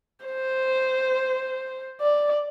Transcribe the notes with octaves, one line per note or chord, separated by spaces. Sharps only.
C5
D5